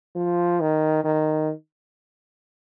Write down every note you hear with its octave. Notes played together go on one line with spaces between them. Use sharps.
F3
D#3
D#3